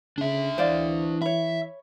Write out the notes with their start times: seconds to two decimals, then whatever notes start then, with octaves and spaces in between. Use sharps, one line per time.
0.18 C#3 D4 E5
0.58 E3 C5 D5 F5
1.22 C#5 E5 B5